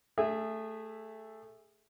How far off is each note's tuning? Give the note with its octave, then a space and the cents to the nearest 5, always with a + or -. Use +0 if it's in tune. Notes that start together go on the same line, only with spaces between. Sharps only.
A3 +0 G#4 -25 E5 +0